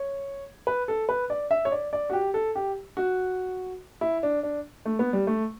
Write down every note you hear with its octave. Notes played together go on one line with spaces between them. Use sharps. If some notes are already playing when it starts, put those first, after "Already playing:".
Already playing: C#5
B4
A4
B4
D5
E5
C#5
D5
D5
F#4
G4
A4
G4
F#4
E4
D4
D4
A3
B3
G3
A3